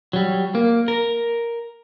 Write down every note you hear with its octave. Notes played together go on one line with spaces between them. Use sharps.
F#3 G3
A#3
A#4